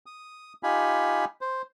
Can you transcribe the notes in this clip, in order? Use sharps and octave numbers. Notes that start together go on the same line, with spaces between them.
D#6
D#4 F4 G4 G#5 B5
C5